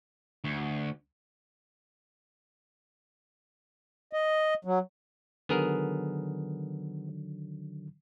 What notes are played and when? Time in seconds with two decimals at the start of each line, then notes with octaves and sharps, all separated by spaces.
0.44 D2
4.13 D#5
4.65 F#3
5.49 D3 D#3 F#3 B3 G#4 A#4